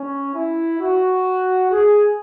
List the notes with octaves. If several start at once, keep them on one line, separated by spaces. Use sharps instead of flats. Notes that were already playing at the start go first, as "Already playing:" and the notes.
Already playing: C#4
E4
F#4
G#4